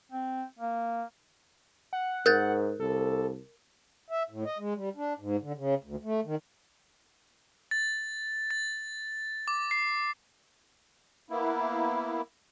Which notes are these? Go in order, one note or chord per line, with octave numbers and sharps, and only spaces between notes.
C4
A#3
F#5
G#2 A#4 F#6 G6 A6
C2 A4
E5
A2
D#5
G#3
G3
D4
G#2
D3
C#3
D2
A3
D#3
A6
A6
D6
C7
A#3 B3 E4